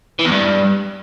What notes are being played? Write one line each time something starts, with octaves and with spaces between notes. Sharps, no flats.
E3
E2
G2